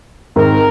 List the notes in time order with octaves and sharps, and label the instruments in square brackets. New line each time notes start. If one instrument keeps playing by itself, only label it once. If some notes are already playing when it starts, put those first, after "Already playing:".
[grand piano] G#2 D#3 C4 [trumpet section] A#4